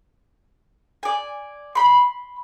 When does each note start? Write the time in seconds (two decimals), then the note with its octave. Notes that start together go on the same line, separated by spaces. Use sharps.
1.03 D5 G#5
1.75 B5 C6